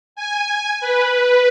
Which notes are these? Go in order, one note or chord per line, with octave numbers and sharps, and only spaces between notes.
G#5
B4